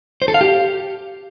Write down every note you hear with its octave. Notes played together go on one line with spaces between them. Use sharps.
C5
A4
F5
G4